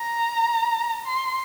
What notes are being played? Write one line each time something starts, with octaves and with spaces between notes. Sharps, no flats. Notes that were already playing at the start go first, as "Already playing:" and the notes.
Already playing: A#5
C6